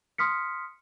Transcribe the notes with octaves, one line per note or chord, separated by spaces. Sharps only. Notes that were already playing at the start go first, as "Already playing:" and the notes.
C6 D#6 F6 B6 C#7